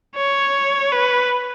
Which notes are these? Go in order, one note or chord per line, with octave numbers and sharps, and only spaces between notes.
C#5
B4